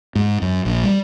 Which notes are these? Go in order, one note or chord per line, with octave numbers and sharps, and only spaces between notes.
G#2
F#2
A#1
G3